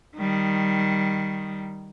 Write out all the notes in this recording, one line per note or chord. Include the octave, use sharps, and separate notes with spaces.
D#3 G3